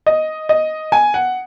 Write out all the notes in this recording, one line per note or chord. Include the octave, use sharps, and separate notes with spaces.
D#5
D#5
G#5
F#5